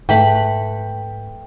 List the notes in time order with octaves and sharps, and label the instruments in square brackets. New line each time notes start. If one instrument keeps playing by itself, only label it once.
[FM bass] G#2 [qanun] A3 B4 B5 [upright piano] G5